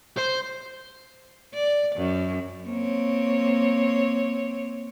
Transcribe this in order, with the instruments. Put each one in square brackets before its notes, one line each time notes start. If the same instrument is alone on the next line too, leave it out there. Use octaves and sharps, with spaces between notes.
[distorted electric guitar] C5
[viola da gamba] D5
F#2
A#3 C4 C#5